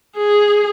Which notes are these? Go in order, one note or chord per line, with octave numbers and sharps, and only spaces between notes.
G#4